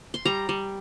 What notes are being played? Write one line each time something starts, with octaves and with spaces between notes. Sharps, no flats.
C6
G3 A#5
G3